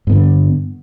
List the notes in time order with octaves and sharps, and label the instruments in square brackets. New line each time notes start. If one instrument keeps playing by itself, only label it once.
[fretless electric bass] G2
B3
D3